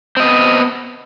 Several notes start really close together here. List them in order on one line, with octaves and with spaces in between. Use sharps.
C4 D#5 B3